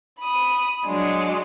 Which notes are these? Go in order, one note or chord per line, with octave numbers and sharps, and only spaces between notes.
B5 D#6
F#3 G#3 D4